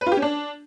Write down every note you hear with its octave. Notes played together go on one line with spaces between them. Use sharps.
B4
F4
G4
C#4
D4